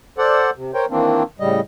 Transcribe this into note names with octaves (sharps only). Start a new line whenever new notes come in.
A4 C5 D5 F#5
C3
A#4 C5 C#5 G5
D#3 E3 A#3 C4 D4
A2 C#3 G3 D#5